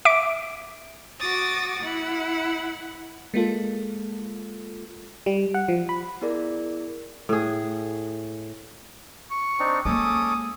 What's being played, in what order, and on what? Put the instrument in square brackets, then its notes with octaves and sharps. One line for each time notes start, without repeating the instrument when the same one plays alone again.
[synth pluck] E5 D6 D7
[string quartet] F#4 D6 D#6 A6
E4 F#5
[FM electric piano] G#3 A#3 F4 A4
G3
F#5
F3
B5
[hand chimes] B3 E4 G#4 A#4 D5
[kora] A2 G#4
[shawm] C#6
[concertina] C4 D4 D#4
[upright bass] G#3 A#3 [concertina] C#4 A4 D6 [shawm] D#6